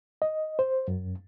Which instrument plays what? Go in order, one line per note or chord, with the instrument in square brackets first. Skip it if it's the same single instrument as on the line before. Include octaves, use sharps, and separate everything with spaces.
[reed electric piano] D#5
C5
F#2